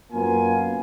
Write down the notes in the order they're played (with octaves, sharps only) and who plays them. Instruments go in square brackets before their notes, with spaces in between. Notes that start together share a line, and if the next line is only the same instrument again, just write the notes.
[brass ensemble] F#2 A#3 B3 F4 G#5